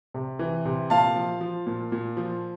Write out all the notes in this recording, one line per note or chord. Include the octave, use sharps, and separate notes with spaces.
C3
E3
C3
A#2 F5 A5
F3
F3
A#2
A#2
F3